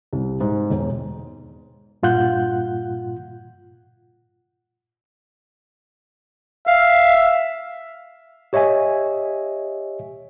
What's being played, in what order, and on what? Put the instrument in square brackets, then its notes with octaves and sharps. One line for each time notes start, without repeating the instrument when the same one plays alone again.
[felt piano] C2
G#2
E1
[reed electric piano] G2 A#2 F4 F#5 F#6 G6
[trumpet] E5 [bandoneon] F5
[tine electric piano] G4 C#5 D#5 E5 G#5